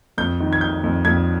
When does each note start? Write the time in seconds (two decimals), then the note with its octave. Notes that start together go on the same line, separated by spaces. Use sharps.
0.18 F2 G6
0.40 D#3
0.53 G#6
0.61 D#3 G6
0.84 F2
1.05 F2 G#6